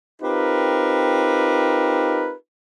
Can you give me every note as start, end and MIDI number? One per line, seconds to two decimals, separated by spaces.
0.21 2.33 60
0.21 2.33 63
0.21 2.33 65
0.21 2.33 67
0.21 2.33 70
0.21 2.33 71